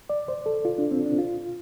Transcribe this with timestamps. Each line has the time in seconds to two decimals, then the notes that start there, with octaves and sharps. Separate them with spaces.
0.10 D5
0.28 C5
0.46 A4
0.65 F4
0.78 D4
0.91 C4
1.06 D4
1.19 F4